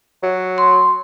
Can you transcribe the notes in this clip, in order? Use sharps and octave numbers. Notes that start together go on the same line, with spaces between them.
F#3
C6